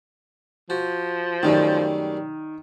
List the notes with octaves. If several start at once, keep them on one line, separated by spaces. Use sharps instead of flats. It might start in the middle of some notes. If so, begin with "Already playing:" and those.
F3 F#4
F#2 D#3 G3 A3